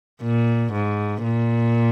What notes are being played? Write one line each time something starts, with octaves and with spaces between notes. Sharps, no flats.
A#2
G#2
A#2